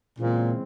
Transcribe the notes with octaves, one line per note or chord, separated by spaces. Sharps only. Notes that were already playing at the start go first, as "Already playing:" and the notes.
A#2 C#3 E3 G#3 C4